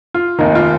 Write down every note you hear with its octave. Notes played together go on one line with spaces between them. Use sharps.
F4
F1 D#2 D#3 D#4
F4